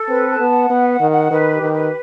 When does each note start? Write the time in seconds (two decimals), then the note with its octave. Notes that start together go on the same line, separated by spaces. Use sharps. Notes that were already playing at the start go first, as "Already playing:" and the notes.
Already playing: A4
0.08 C4 B4
0.29 A5
0.40 B3
0.50 F#5
0.70 B3 B4
0.90 F#5
1.00 D#3
1.10 F#5
1.31 D#3 B4
1.51 G4
1.61 D#3
1.72 B4